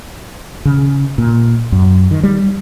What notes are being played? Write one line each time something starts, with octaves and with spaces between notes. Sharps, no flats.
C#3
A#2
F#2
D#3
G3